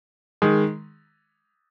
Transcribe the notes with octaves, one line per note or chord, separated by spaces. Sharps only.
D#3 G#3